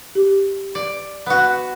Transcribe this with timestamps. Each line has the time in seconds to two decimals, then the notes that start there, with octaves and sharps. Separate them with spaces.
0.15 G4
0.75 D5
1.26 B3 F#4